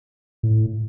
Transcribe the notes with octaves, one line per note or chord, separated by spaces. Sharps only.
A2